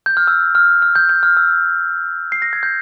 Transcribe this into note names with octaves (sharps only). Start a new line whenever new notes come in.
G6
F6
E6
F6
F6
G6
G6
F6
E6
C7
A#6
G#6
G6